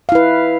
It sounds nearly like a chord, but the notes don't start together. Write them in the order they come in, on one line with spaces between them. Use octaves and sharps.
F5 E4 B4